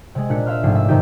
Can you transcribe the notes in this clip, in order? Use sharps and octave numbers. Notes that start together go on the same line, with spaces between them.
C3 G#3
A#2 D4 F#6 B6 C#7
E5 F5 C6 F6
A#1 G#2 C3 A3 C7
E5
G2 C3 D#3 D#4 G4 B6